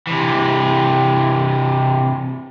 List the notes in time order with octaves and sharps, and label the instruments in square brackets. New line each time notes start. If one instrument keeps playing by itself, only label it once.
[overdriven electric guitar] C3 E3